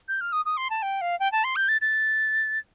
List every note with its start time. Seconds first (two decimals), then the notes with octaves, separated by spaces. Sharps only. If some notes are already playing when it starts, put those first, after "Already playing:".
0.08 G6
0.21 F6
0.32 D#6
0.45 D#6
0.57 C6
0.70 A5
0.82 G5
1.01 F5
1.20 G5
1.32 A5
1.44 C6
1.56 G6
1.68 A6
1.81 A6